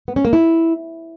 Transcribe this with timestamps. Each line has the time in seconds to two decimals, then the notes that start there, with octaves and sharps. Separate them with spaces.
0.08 B3
0.16 C#4
0.25 A#3
0.33 E4